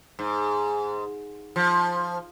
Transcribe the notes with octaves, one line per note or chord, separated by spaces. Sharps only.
G#2
F3